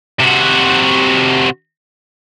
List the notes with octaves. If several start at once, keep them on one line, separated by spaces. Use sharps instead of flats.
C3 F#4